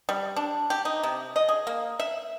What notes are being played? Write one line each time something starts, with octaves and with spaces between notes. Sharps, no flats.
G3
D4
G4
D#4
C3
D#5
G#4
A#3
E5